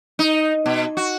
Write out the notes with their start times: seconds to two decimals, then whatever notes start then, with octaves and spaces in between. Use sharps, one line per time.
0.19 D#4
0.66 B2
0.97 F#4